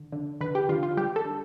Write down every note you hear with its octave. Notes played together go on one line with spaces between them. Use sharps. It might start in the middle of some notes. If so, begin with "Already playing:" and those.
Already playing: D3
D3
D3 B4
G4
D3 F4
F4
G3 G4
A4
D3